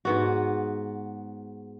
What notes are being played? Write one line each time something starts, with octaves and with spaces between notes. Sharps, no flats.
G#2 B3 F#4